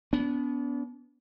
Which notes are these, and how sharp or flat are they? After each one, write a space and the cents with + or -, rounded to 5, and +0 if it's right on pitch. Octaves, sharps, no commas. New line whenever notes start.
B3 +0 D4 -40